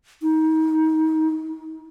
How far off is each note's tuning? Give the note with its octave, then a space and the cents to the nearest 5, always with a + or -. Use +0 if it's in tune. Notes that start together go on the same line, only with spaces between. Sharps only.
D#4 +30